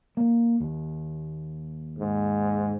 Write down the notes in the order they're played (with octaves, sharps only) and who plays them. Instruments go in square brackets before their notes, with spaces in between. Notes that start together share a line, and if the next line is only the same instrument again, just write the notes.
[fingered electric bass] A#3
D#2
[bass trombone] G#2